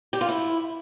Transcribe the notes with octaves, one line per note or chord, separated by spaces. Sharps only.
G4
F4
E4